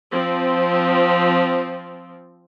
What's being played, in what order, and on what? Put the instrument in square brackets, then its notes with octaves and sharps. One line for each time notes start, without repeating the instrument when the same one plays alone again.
[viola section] F3 C4